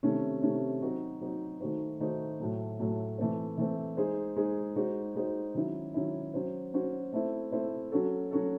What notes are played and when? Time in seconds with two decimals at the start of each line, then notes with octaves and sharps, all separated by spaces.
0.03 C3 D#3 A3 C#4
0.42 C3 D#3 A3 C#4
0.82 F#3 C4 D#4 F#4
1.21 F#3 C4 D#4 F#4
1.60 D#3 A3 D#4 F#4 C5
2.00 D#3 A3 D#4 F#4 C5
2.40 A2 F#3 A3
2.79 A2 F#3 A3
3.18 E3 A3 C4
3.58 E3 A3 C4
3.97 G#3 D#4 G#4 C5
4.37 G#3 D#4 G#4 C5
4.76 G#3 D#4 F#4 C5
5.15 G#3 D#4 F#4 C5
5.54 D#3 F#3 C#4 E4
5.94 D#3 F#3 C#4 E4
6.34 F#3 C#4 F#4 C5
6.73 F#3 C#4 F#4 C5
7.13 A3 C4 E4 C5
7.52 A3 C4 E4 C5
7.92 F#3 C#4 F#4 A4
8.31 F#3 C#4 F#4 A4